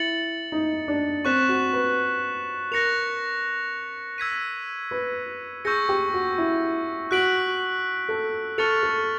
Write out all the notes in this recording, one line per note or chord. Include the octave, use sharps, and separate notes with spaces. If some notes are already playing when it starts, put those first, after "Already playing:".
Already playing: E4 A6 C#7 F#7
D#4
D4
C4 C#6 F#6 B6 E7
F#4
B4
A#4 F#6 A#6 C#7 F7
E6 G#6 B6 D#7
B4
G#4 C#6 E6 G6 A#6 C#7
G4
F#4
E4
F#4 F#6 B6 D7 F#7
A4
A4 C#6 F6 A6 C#7 F7
A4